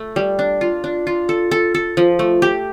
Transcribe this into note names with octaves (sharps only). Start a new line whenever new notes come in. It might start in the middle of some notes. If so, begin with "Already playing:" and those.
Already playing: A3
G3
D4
F4
D4
F4
A4
A4
A4
F3
A3
G4